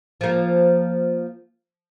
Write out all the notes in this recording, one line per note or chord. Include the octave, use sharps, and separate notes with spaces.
F3 A#3